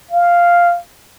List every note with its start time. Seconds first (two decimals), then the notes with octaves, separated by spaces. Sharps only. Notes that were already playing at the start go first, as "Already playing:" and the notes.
0.11 F5